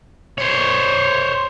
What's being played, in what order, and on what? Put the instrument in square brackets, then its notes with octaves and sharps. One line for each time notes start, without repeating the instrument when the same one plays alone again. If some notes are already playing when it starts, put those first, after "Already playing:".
[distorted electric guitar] C5 C#5